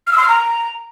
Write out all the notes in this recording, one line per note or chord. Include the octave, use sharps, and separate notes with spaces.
F6
E6
C6
F6
A#5